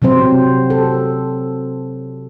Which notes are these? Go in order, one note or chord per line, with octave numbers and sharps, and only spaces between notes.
C3 F#3 C4 C5
A4